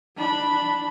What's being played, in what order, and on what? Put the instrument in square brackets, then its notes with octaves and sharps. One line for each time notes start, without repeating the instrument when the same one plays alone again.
[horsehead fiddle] D4 B5